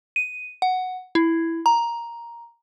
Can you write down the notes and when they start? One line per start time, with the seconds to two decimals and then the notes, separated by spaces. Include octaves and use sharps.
0.16 D#7
0.62 F#5
1.15 E4
1.66 A#5